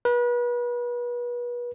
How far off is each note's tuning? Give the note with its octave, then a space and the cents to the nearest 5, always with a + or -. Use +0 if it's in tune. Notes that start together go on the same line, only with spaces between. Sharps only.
B4 -35